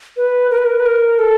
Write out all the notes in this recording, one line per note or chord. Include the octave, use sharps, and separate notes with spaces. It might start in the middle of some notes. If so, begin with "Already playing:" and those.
B4
A#4
B4
A#4
B4
A#4
A4